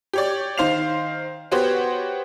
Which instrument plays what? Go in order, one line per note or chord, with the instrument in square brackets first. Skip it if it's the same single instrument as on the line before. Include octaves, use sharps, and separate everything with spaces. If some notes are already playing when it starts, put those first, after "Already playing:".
[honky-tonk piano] G4 C#5 D5
D#3 C5 F5 C7 F7
B3 F#4 G4 C5 C#5